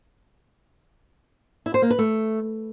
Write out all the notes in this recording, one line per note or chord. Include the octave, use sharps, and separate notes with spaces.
E4
C5
A#3
B4
A3